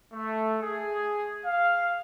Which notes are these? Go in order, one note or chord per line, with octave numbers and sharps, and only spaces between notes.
A3
G#4
F5